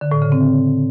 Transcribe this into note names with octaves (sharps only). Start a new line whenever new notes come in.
D3
A2
C#3
C4